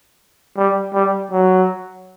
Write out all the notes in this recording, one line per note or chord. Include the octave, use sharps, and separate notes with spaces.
G3
G3
F#3